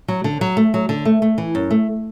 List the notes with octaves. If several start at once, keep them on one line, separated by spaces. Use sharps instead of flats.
F#3
D3
F#3
A3
F#3
D3
A3
A3
E3
F#2
A3